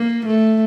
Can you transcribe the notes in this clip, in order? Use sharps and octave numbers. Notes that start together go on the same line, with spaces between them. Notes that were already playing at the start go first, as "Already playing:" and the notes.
Already playing: A#3
A3